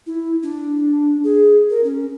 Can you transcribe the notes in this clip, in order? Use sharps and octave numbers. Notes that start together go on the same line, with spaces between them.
E4
D4
G#4
A#4
C#4